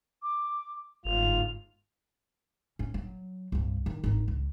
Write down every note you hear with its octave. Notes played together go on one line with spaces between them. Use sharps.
D6
G1 G#2 F4 F7
C#4
F#3
C2 G2
D#3
G#1 D#4
C#2